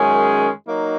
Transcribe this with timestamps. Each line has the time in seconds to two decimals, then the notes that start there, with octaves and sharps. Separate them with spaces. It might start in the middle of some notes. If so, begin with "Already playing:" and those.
Already playing: F#2 D#3 G#3 C#4 G#4
0.68 F#3 A#3 D#4